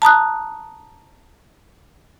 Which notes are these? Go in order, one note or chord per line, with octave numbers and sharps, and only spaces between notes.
A5 A#5 D#6 F#6